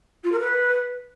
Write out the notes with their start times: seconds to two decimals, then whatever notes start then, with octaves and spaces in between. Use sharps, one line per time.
0.23 F4
0.31 A#4
0.39 B4